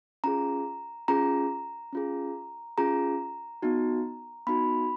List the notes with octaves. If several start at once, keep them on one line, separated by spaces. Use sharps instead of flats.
C#4 F4 G#4 A#5
C#4 F4 G#4 A#5
C#4 F4 G#4
C#4 F4 G#4 A#5
B3 D#4 F#4
B3 D#4 F#4 B5